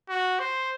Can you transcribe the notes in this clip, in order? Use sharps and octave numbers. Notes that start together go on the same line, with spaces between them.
F#4
C5